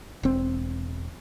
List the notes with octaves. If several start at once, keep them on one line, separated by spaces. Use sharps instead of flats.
E1 C4